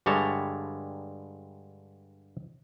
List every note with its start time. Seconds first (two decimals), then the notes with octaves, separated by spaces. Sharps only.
0.06 G2 D3 G3 G#3 C#5 A5